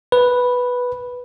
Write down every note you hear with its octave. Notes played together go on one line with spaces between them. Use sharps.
B4